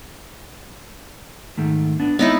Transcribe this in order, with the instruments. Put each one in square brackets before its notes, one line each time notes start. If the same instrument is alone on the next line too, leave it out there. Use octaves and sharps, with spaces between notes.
[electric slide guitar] G#2 D#3 A3
B3 D4
[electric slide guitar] G#3 C4 C#5 [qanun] B3 D#4 E4